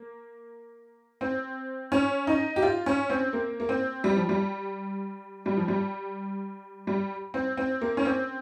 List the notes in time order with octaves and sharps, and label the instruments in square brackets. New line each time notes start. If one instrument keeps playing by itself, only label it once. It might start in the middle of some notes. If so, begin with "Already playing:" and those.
Already playing: [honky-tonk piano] A#3
C4
C#4
D#4
G4
F4
C#4
C4
A#3
A#3
C4
G3
F3
G3
G3
F3
G3
G3
C4
C4
A#3
C#4
C4